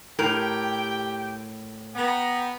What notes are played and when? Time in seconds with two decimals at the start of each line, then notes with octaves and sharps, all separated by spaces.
0.19 A2 G4 A#4 G5
1.94 B3 G5 A#5